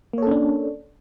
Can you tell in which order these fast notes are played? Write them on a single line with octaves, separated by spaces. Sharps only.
A#3 C#5 A4 C#4 D4